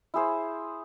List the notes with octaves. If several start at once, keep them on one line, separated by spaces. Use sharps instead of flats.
E4 G#4 C5